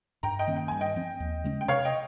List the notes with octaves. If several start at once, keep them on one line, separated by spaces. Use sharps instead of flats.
G2 G5 A#5
D#5 G5
D#3 A#3 C#4
G5
G2 G#5
D#5 G5
F3 C4
D#2
C#3 G#3 C#4
G5
C3 C#5 F5
D#5 G5